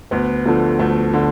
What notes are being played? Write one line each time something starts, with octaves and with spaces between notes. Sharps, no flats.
D2 B3
D3 F3 A3
D2 A3
D3